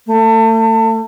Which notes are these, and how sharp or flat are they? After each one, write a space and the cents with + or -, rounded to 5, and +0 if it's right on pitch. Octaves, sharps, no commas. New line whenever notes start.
A3 +30